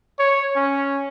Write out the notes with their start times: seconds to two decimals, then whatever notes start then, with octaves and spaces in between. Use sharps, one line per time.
0.19 C#5
0.56 C#4